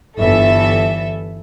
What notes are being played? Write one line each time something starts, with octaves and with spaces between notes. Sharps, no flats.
G1 E3 A4 E5